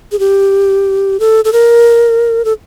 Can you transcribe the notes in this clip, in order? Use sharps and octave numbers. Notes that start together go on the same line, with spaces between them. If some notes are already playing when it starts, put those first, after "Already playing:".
G#4
G4
A4
A4
A#4
A4